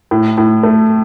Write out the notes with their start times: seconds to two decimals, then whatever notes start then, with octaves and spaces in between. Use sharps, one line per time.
0.11 A2
0.38 A2
0.63 A3